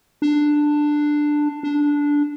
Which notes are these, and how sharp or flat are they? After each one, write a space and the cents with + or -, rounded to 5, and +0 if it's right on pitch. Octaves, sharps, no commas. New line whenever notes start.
D4 +10
D4 -10